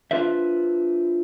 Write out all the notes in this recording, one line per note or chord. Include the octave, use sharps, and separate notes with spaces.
D4 F4 B4 C5 E5